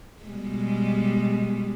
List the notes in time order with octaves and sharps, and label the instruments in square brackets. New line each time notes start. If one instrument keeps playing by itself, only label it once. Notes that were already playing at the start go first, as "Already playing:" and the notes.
[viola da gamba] B2 G3 G#3